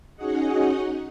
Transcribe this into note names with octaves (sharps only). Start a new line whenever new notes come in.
C#4 D#4 F#4 G#4 D#5 F#5